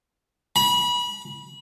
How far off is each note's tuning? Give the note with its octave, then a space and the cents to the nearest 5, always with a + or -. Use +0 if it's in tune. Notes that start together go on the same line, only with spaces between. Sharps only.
B5 -30